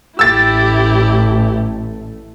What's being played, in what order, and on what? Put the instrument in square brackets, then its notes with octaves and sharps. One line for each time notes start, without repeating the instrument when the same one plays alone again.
[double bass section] A1 A3 [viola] E4 G4 [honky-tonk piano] E6 A6